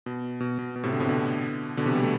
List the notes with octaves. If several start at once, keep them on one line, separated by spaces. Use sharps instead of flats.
B2
B2
B2
B2
A2 C3
B2 D3
A2 C3
B2 D3
B2 D3
C3 E3
G3 B3
A3